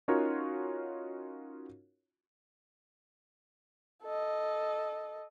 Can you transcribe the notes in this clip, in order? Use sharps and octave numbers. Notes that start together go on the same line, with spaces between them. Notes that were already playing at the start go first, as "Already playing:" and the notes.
C#4 D#4 F4 F#4 A#4 C#5
A4 D#5